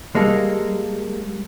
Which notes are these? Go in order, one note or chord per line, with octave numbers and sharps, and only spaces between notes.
G3 G#3 A#3 A4